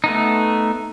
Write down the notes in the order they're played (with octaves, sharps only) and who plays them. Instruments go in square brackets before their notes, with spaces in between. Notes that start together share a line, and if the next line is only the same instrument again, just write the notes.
[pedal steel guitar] A3 B3 D#4